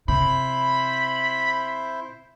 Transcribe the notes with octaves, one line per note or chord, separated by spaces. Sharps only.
C3 E4 C5 B5